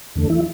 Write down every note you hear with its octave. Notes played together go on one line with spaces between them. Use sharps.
E2 D3 A3
E3 E4